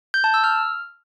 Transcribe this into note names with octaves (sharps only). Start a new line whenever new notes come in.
G6
A5
E6
F6